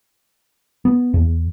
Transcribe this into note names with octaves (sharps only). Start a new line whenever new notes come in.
B3
E2